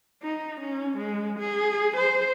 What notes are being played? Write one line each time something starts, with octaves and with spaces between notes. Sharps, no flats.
D#4
C#4
G#3
G#4
C5